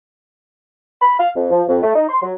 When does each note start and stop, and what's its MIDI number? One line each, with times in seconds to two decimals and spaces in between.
1.02 1.15 83
1.19 1.30 77
1.36 1.47 41
1.51 1.64 53
1.68 1.78 41
1.82 1.94 57
1.95 2.06 63
2.09 2.19 84
2.23 2.33 54